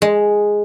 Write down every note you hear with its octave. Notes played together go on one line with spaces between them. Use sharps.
G#3